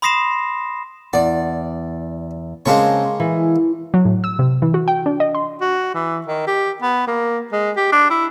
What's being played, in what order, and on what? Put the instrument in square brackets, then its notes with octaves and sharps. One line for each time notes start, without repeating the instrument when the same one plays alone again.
[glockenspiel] B5 C6 D#6 A#6 C7 E7
[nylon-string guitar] E2 F#5 [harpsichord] D5
[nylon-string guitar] C#3 C4 A5 [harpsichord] G#3 A#3 C#5
[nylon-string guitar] E3
[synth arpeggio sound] F#3
A2
E6
C3
E3
F#4
G5
D4
D#5
C6
[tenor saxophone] F#4
E3
D#3
G4
B3
A#3
G#3
G4
D4
E4